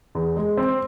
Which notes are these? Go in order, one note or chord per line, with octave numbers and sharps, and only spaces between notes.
E2
G#3
C4